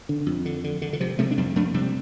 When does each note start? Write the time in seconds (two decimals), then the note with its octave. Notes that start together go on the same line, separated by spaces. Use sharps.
0.09 D3
0.26 F2
0.45 D3
0.64 D3
0.82 D3
0.93 D3
1.00 C3 F3
1.19 C3 F3 A3
1.31 D4
1.38 F2 G3 C4
1.56 F2 A3 D4
1.74 C3 G3 C4